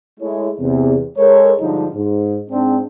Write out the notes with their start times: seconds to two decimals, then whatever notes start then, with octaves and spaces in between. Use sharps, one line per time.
0.20 G#3 A3 E4 C#5
0.60 E2 C3
1.18 G#3 A4 A#4 C#5
1.59 G2 D3 F3 G#3 D#4
1.95 G#2
2.50 G#2 C4 D4